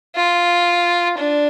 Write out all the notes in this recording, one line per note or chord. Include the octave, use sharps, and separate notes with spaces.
F4
D4